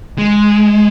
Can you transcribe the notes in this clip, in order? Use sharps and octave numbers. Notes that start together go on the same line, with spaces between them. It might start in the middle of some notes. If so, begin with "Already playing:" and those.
G#3